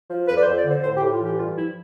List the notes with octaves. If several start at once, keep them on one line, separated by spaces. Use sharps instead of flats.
F3
F2 B4
D5
C5
F2
D5
D3
C5
A2 C5
G4
A2
F4
E3
G4
G2 F4
F3 E4